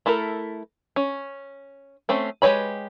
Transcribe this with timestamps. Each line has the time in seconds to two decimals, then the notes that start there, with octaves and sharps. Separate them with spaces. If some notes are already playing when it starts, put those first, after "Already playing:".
0.06 A3 E4 A4 A#4
0.96 C#4
2.09 A3 C4 C#4
2.42 G#3 G4 B4 C#5 B5